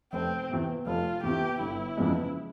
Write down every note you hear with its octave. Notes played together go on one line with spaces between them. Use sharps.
F1 C4
E2 C3
F1 F4
E2 C3 G4
G1 E4
F2 C#3 E3 G#3